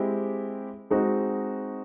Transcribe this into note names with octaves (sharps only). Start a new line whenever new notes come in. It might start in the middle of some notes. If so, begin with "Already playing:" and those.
Already playing: G#3 C4 E4 G4
G#3 C4 D#4 F#4